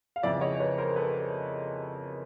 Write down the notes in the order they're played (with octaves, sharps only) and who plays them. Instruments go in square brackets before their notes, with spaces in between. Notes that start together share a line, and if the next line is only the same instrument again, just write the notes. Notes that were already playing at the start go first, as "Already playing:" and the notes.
[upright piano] F5
F2 C#3 E3 D5 E5
C#5 D#5
B4 C#5
A#4 C5
A4 B4